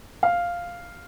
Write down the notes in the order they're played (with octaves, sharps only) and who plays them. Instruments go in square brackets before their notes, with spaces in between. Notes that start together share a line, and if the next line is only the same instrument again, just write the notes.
[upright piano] F5